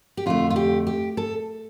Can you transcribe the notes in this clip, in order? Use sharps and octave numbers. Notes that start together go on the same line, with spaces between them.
G4
F2 D3 A3 F4
F4
G4
G4
A4